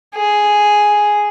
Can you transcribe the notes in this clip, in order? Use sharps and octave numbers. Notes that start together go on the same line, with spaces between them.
G#4